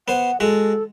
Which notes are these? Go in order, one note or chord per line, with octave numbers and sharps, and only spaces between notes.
B3 C5 F#5
G#3 F#4 A4